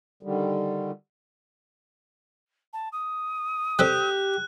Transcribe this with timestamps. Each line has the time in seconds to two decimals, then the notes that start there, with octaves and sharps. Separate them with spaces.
0.23 D3 D#3 G3
2.73 A5
2.92 D#6
3.79 G3 C4 G4 A4 F#6